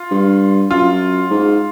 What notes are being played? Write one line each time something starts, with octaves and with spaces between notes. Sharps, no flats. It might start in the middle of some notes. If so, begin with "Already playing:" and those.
Already playing: F4
G2
F#2 F4
G#2